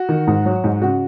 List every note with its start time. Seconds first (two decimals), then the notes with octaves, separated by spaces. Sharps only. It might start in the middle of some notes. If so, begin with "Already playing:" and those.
Already playing: F#4
0.09 D#3
0.27 G#2
0.46 F#3
0.64 G#2
0.82 C#3 F#4